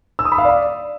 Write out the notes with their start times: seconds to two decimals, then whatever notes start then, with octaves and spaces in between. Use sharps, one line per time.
0.19 E6
0.25 D#6
0.32 B5
0.38 F5
0.45 D5